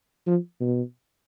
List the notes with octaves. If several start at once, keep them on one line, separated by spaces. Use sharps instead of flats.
F3
B2